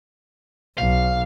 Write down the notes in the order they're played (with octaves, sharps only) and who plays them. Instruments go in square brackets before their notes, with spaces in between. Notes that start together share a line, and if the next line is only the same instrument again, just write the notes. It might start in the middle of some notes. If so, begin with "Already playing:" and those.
[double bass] B1 [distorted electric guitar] F5